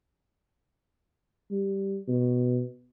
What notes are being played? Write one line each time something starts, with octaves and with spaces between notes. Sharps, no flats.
G3
B2